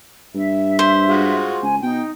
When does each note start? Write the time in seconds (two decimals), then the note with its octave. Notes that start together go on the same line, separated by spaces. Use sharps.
0.35 G2 E5
0.79 C5
1.08 G#3 F4 F#4
1.62 C#2 G#5
1.83 B2 D#4 G5